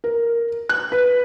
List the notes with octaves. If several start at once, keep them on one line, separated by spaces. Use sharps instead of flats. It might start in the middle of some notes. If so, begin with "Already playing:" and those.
A#4
F#6
B4